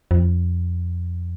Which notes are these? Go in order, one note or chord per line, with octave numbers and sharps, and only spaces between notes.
F2